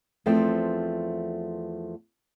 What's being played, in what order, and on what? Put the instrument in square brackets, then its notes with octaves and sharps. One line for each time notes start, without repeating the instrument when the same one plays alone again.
[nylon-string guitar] E2 F3 A3 C4 G5